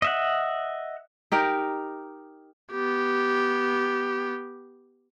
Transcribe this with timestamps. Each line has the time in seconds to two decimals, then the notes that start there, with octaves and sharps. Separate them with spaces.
0.02 D#5 E5 F#5
1.32 D#4 G4 A#4
2.72 B3 G4